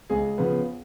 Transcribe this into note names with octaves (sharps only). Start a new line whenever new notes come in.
C#2 G#4
C#3 F3 B3